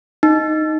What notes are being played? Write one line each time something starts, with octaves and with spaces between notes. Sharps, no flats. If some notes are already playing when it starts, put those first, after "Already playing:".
D#4